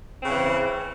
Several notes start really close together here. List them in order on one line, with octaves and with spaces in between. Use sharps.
C4 C#3 E3